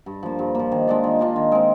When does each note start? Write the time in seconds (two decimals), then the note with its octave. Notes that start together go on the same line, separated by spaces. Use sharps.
0.06 G2
0.23 F3 A#3
0.39 G2
0.55 F3 A#3
0.72 D#3
0.87 G#3 D4 F4
1.04 D#3
1.19 G#3 D4 F4
1.36 D#3
1.52 G#3 C4